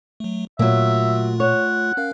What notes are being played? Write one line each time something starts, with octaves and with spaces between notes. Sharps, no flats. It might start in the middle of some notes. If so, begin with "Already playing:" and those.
F#3 A3
A#2 F#3 A3 A#3 F4 E5
C#5 F#5
C#4 A#4 F5